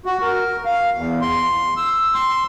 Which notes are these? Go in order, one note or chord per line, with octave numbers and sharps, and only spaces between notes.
F#4
A#4
F5
E2
C6
E6
C6